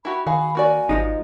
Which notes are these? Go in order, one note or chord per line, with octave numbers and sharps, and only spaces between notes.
E4 F#4 G4 B5
D#3 F#4 G#4 F5 B5
A#3 F#4 D5 G#5
G#1 F3 G#3 D#4